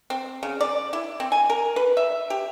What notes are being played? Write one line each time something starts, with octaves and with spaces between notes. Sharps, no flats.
C4
C#3
D5
E4
C4
G#5
A#4
B4
E5
G4